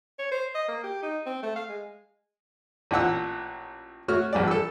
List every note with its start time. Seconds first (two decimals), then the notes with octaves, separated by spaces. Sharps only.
0.19 C#5
0.31 C5
0.55 D#5
0.68 A#3
0.84 G4
1.03 D#4
1.26 C4
1.43 A3
1.56 F5
1.69 G#3
2.91 A1 A#2 F#5 E6
4.08 A3 F#4 C#5 F6
4.33 A#1 G2 E3 D5
4.48 A4 E6